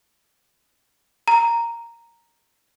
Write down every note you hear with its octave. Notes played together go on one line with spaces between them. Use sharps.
A#5